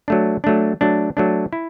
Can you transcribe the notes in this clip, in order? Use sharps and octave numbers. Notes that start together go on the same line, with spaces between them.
F#3 A3 D4
F#3 A3 D4
F#3 A3 D4
F#3 A3 D4
E4